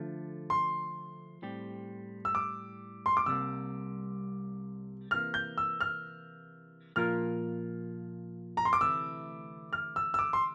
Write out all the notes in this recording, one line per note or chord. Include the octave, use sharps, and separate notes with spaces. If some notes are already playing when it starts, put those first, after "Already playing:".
Already playing: D3 F3 A3
C6
A2 G3 C4 G4
E6
D6
C6
D6
C2 C3 G3 A#3 E6
C3 E3 A#3 F6
G6
E6
F6
A#2 F3 A#3 F4 A#4 F6
A#5
C6
D6
D2 C3 E3 A3 E4 E6
F6
E6
E6
D6
C6